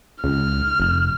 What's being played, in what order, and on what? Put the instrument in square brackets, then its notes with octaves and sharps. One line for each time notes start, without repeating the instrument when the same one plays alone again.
[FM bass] C#2 [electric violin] F6
[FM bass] F1